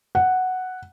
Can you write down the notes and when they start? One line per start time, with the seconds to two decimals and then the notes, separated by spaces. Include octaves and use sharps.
0.15 F#5